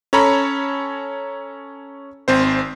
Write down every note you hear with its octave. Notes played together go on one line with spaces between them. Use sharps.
C#4 A4 C#5 A#5 B5
G#1 C4 C5